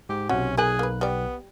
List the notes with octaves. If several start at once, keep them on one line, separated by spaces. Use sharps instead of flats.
G#2 G4
B1 C3 C#4 F#4
B1 G#4 A#4 G#5 F#6
A#3 B4
G3 B3 D5